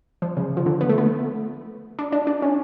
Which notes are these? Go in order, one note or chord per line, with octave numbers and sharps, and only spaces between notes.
F3
C#3
F3
D3
B3
A3
B3
D4
D4
D4
C#4